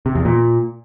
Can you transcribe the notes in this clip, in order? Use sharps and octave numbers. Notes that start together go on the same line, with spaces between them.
C3
E2
A#2